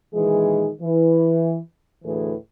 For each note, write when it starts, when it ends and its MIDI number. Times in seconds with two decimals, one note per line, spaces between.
0.14 0.69 46
0.14 0.69 51
0.14 0.69 52
0.14 0.69 56
0.14 0.69 68
0.81 1.58 52
2.04 2.33 38
2.04 2.33 45
2.04 2.33 52
2.04 2.33 68
2.04 2.33 71